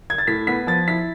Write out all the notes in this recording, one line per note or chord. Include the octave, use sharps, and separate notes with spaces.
G#6
A6
A2 B6
B3 B6
F3 A6
E4 B6